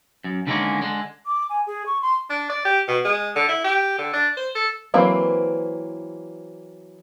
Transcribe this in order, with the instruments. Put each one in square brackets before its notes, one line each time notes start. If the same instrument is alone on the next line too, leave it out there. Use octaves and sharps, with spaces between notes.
[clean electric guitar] F#2
D3 D#3 G3 G#3 A#3 C#4
D3 G#3
[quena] D6
G#5
G#4
C#6
C6
[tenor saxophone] D4
D5
G4
B2
G#3
D3
E4
G4
D3
D4
C5
A4
[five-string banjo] E3 F#3 A#3 C4